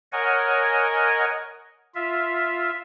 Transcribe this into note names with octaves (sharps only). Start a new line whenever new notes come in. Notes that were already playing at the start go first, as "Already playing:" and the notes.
A#4 C#5 D#5 F#5 G#5
F4 E5